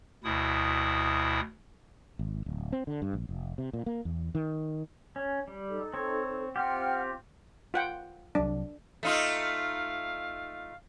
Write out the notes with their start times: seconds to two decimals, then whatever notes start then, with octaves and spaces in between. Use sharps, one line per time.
0.24 D2 B2 E4 D#6
2.19 G#1
2.46 D1
2.72 C4
2.87 D3
3.02 G2
3.13 A#1
3.29 F1
3.58 C3
3.73 A#2
3.86 A#3
4.05 E2
4.35 D#3
5.16 C#4
5.48 G3
5.69 D#4 A4
5.94 C4 C#5
6.56 C4 F4 G4 F#5 G5 F6
7.74 F4 F#5 G5
8.35 C2 F#3 D4
9.03 A3 D#4 F4 F5